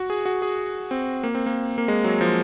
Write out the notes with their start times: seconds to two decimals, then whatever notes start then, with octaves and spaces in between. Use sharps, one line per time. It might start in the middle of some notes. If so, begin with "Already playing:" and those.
Already playing: F#4
0.10 G#4
0.26 F#4
0.42 G#4
0.91 C4
1.23 A#3
1.35 C4
1.46 A#3
1.78 A#3
1.88 G#3
2.04 F#3
2.21 F3